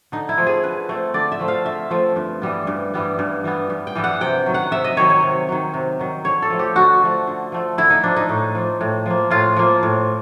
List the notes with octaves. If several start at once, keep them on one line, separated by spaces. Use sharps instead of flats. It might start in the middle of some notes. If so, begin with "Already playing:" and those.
D3 D#4
E4
F3 A3 C4
G#4
D3 B4
F3 A3 C4
D3 D5
E5
F3 A3 C4
F5
D3 E5
F3 A3 C4
G2
E3 G3 B3
G2
E3 G3 B3
G2
E3 G3 B3
G2
G5
E3 G3 B3
F#5
C3 G5
D#3 F#3
F#5
C3 E5
D#5
D#3 F#3 C#5
C#5
C3
D#3 F#3
C3
D#3 F#3
D3 C#5
A4
F3 A3
G4
D3 F#4
F3 A3
D3
F3 A3
D3 E4
D#4
F3 A3 D4
D#4
A2
F3 A#3
A2
F3 A#3
A2 F4
F3 A#3
A2